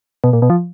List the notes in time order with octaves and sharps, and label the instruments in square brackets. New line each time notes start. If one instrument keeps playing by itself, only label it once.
[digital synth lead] B2
A#2
B2
F3